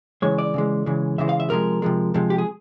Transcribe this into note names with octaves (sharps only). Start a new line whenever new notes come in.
C#3 E3 G#3 C#5
D5
C#3 E3 G#3
C#3 E3 G#3
C#3 E3 G#3 E5
F5
E5
C3 F3 G#3 A#4
C3 F3 G#3
C3 F3 G#3
G4
G#4